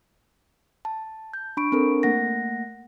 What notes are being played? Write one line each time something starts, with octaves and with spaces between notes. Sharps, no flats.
A5
G6
D4 B5 C#6 D7
C4 D4 A4 A#4
A3 A#3 F#5 A#6